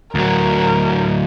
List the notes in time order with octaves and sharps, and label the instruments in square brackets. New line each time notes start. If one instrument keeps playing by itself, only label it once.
[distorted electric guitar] D2 F#3 [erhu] A#4